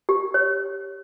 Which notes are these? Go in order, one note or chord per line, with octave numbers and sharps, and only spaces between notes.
G4
C#5